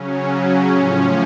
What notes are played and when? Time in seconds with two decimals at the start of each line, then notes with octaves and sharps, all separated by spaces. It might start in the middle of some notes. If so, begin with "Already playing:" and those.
Already playing: C#3 F#3 C#4
0.28 C#4
0.70 A2 F3